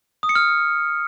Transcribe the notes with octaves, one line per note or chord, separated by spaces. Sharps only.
D#6
C#7
F6